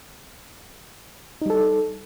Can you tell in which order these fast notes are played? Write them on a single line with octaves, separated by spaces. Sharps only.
D#4 G3 A4